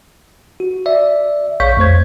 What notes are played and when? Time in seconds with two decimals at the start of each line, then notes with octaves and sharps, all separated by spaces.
0.60 F#4
0.86 D5 E5
1.60 A#1 C#5 F5 C#6 G6 B6
1.77 F2 A3 C5 G#6